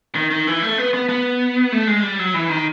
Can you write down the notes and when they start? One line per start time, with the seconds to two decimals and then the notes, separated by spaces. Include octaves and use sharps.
0.15 D#3
0.30 D#3
0.47 E3
0.63 A3
0.78 B3
0.94 B3
1.09 B3
1.72 A3
1.87 G#3
2.03 G3
2.19 F#3
2.34 E3
2.49 D#3